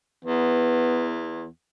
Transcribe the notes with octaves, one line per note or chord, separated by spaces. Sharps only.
E2 B3